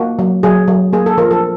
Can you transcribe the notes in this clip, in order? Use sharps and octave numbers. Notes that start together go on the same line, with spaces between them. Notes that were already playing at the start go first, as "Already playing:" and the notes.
Already playing: A#3 F#4
F#3
F#3 G#4
F#3
A#3 G#4
A4
F3 A#4
A4